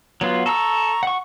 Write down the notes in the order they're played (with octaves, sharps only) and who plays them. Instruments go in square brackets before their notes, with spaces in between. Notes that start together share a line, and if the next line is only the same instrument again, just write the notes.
[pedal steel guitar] F#3 B3 F4
[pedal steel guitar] A4 E6 [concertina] A#5 C#6
[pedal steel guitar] F#5 C#6